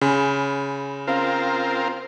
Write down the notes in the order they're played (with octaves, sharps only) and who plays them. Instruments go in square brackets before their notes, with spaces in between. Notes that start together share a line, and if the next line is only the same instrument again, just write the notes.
[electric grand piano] C#3 [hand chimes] G#5 B5 C6
[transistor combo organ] C4 F4 A#4 [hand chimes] C#4 F5